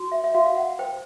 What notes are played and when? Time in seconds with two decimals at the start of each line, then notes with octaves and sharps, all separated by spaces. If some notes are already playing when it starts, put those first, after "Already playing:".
Already playing: F#4
0.12 E5
0.24 E5
0.34 F#4 F5
0.46 F5
0.56 F#5
0.79 C5 G5